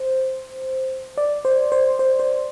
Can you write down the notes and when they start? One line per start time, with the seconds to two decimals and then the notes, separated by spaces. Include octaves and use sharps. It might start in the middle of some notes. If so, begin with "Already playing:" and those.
Already playing: C5
1.18 D5
1.45 C5
1.72 C5
1.99 C5
2.20 C5